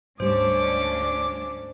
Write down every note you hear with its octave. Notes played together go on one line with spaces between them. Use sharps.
D2 G#2 G3 C#4 D4 C5 D6